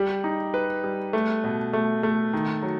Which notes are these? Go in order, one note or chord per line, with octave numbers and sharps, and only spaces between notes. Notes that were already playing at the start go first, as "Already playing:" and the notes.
Already playing: G3 G4
D#4
B4
G3
A3
B2
A3
A3
D#3
F#3